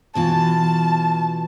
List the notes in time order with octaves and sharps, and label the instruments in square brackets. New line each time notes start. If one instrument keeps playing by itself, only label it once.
[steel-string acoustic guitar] B2 E3 F4 [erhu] A5